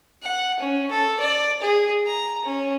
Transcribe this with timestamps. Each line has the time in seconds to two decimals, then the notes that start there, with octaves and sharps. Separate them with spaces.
0.23 F#5
0.60 C#4
0.91 A4
1.20 D5
1.62 G#4
2.07 A#5
2.45 C#4